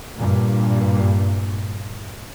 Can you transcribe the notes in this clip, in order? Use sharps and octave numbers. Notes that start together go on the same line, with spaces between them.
G2 A#2